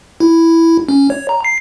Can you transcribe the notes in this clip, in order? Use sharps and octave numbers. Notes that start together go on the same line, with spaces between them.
E4
C#4
C#5
A#5
C7